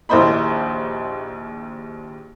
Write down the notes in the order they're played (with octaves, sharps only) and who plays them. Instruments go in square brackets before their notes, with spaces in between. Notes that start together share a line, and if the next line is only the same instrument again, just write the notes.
[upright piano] A#1 D#2 E4 C5 D#5 B5